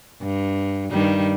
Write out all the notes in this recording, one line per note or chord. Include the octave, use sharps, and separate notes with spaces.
G2
G2 D#3 G3